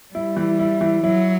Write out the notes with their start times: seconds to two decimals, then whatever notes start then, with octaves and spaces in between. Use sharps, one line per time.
0.14 G3 E4
0.37 E3
0.59 E4
0.81 E3
1.04 F#3 E4